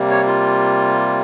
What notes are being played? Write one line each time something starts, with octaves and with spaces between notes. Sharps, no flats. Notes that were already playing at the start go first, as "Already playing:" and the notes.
Already playing: C3 G3 A#3
C#5
F4